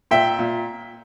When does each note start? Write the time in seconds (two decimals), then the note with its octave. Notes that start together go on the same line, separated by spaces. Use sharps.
0.11 A#2 E5 G5
0.39 A#2